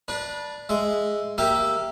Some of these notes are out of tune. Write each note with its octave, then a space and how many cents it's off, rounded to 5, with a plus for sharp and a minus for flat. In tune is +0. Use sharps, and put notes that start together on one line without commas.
D4 +0 B4 -35
G#3 +0 E5 +0
A#3 +0 G4 +0 E5 +0